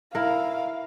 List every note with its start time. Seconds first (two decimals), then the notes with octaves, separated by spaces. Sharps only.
0.15 E4 A#4 F5